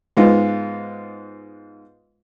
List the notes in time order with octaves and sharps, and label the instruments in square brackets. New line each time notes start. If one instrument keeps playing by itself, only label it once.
[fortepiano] G#2 G#3 B3 F4